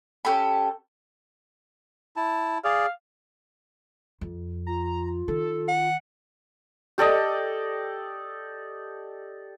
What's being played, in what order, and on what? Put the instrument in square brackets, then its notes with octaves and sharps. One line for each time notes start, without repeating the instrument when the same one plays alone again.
[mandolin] C#4 G4 A4 B5
[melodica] E4 A5
[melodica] G#4 D5 [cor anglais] F5
[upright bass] F2
[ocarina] F4 [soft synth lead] A#5
[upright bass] D#3 [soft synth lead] A4
[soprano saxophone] F#5
[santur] G4 A4 D5 D#5